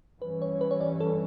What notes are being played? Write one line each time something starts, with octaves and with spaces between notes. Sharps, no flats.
G2 E3 G3 C#4 B4
C#5
B4
C#5
D5
A4